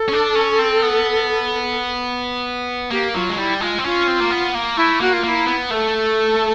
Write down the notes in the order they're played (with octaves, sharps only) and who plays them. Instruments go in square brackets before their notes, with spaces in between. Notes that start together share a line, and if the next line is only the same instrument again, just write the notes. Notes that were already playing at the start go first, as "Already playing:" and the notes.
Already playing: [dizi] A4
[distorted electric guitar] C#4
D4
C#4
C4
B3
[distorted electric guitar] A#3 [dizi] G4
[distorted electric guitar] F#3 [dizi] F4
[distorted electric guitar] G#3
[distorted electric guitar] G3 [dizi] E4
[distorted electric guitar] G#3 [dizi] F4
[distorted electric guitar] C4
[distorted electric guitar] C#4 [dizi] F4
[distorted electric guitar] C4
A#3
B3
A#3
[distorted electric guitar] A3 [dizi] E4
[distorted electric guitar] A#3 [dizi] F#4
[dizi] F4
[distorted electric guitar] A#3 [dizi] F4
[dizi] E4
[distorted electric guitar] B3
[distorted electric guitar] A3 [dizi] A4 A#4